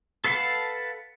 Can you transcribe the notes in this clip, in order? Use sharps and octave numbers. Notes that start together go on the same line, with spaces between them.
A4 B4 F5 F#5 A5